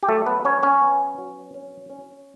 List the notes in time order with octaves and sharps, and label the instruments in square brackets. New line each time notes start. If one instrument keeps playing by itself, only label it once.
[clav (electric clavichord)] G4
F#3 A3 A4
B3 B4
F#3 C#4 C#5
C#4 C#5
B3
F#3
C#4
C#4